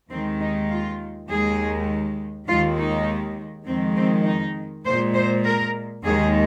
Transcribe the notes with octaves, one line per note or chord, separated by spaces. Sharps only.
D#2 D#3 G#3 C4
D#4
F4
D#2 D#3 G#3 G#4
D#2 D#3 G#3 F4
D#4
F2 D#3 G#3 C4
C4
D#4
A#2 G#3 C5
C5
A#4
D#2 D#3 G#3 G#4